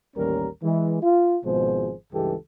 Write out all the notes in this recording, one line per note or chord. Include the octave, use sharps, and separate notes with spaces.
A1 D#2 G3 C#4 A#4
E3 G#3
F4
G#1 B2 F3 G#3 G#4 C5
C#2 G2 E3 G#3 G4 A4